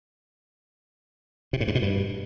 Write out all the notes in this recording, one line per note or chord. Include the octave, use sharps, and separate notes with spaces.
C3
A2
G2
B2
G2